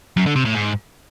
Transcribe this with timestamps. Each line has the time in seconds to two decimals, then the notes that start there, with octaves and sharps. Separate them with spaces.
0.17 F#2
0.26 D3
0.36 C3
0.45 A2
0.55 G#2